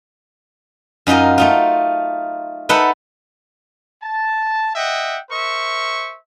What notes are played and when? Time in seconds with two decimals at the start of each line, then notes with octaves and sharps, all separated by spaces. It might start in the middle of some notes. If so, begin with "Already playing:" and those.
1.07 F#2 D#4 F4 A#4 D#5
1.38 A3 D#4 F4
2.69 D#4 A4 B4 E5 F#5
4.02 A5
4.76 D#5 E5 F#5 G5
5.30 A#4 C5 E5 C#6